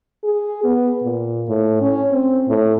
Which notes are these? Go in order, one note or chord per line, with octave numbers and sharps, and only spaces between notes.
G#4
B3
A#2
A2
C#4
C4
A2